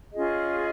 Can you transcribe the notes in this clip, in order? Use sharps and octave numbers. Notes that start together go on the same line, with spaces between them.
C#4 F4 G#4 D#5